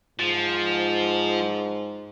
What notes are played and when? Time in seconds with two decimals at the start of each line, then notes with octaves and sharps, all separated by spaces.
0.19 G#2 F3